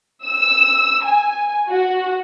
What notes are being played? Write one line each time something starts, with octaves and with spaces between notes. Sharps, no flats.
E6
G#5
F#4